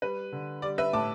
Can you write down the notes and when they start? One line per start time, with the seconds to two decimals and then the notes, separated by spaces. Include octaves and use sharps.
0.02 G3 B4
0.32 D3
0.62 G3 D5
0.78 B4 E5
0.93 A2 A5 D6